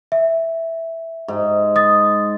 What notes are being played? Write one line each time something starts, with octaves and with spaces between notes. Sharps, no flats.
E5
G#2
D#6 A6